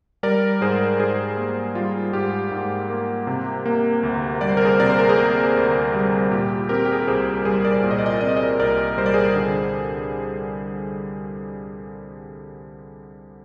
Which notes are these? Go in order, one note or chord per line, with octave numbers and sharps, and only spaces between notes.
G3 A#4 D5
G#2 G#4 C5
G#2 G#4 C5
A#3
G3 F4
G#2 G4
G#2
A#3
C3
A#3
D2
G3 D5
C5
A#4
G#4 C5
C3 D5
C5
A#4
G#4 C5
A#3
D2
G3
A#2 G4
C4 G4 A#4
G4
G#4
A#4
C2 G#4 C5
G3 G#4 C5
A#4 D5
A#2 D5
D#5
D5
D#5
D5
C4 D#5
D5
D#5
A#4 D5
C2 A#4 D5
G3 C5
D5
G#4 C5
D3